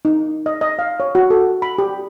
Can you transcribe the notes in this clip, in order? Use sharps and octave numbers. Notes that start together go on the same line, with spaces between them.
D#4
D#5
D#5
F5
C#5
F#4
A4
B5
G4